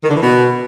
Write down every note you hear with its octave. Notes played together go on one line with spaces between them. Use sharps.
D#3
D3
E3
B2